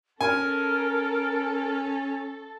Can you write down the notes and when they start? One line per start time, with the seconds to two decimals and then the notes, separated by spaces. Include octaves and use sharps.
0.21 C#4 A4 A#4 G#5